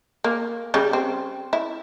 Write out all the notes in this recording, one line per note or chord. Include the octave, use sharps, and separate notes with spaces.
A#3
C#3 G3
C4
E4